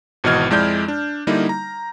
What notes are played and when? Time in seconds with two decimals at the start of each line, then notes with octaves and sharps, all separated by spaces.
0.24 G#1 B2 E3 D#5 F6 G#6
0.51 F2 G#3 E4 D5 G6
0.88 D4
1.27 D3 G3 A#3 D#4 E4
1.49 A#5